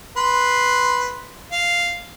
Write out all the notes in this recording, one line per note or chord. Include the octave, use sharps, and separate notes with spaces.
B4 C6
F5